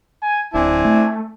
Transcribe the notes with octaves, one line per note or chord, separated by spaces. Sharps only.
G#5
D1 C4 D4 E4 G#5
A3